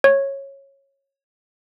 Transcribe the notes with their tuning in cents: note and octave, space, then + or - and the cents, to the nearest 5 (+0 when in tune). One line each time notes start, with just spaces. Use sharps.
C#5 -15